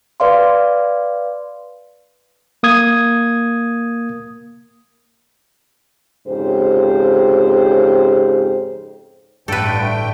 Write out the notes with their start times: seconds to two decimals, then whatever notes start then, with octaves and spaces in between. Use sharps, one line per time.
0.20 B4 D5 F5 C6
2.63 A#3 D#6 G#6
6.27 F2 G#2 C#3 G4 C5
9.48 A1 G2 D3 A3 A4 B4 G5